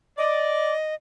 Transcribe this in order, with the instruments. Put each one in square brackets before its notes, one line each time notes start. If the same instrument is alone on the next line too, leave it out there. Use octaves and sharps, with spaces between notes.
[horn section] D5 [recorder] D#5